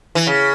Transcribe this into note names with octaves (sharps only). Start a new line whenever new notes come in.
E3
C#3